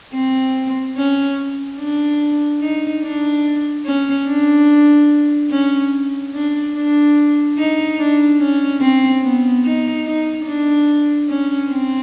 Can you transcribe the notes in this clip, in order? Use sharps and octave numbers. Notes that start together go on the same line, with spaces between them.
C4
C#4
D4
D#4
D4
C#4
D4
C#4
D4
D4
D#4
D4
C#4
C4
B3
D#4
D#4
D4
C#4
C4